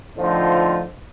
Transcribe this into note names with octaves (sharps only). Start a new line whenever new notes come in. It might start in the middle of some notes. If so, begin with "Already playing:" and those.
A2 D3 F3 C4 D#4 F4